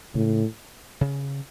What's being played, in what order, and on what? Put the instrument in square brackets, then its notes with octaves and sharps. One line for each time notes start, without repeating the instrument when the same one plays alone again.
[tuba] A2 [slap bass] C#3
[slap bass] C#3